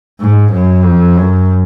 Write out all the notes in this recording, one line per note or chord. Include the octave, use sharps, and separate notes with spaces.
G#2
F#2
F2
F#2